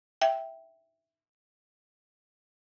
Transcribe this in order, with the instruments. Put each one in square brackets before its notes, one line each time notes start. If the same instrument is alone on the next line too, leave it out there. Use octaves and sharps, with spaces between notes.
[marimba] E5 G5